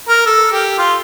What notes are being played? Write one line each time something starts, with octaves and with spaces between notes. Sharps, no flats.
A#4
A4
G4
F4